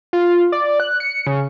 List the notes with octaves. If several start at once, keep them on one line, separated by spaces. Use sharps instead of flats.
F4
D5
F#6
C#7
C#3